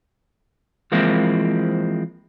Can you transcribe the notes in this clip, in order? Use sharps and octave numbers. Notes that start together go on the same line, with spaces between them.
E3 F3 G#3 A#3 C4 E4